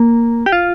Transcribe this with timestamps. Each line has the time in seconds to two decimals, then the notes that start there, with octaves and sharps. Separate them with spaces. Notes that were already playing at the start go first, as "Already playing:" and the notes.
Already playing: A#3
0.46 G4
0.52 F4